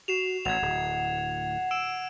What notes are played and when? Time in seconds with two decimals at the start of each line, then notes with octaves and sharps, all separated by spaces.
0.08 F#4 C7 E7 F7
0.45 A1 F#5 G#6 F7
0.62 D1
1.71 E6 D7 E7